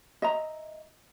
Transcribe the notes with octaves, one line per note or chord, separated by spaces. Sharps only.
D#5 E5 A#5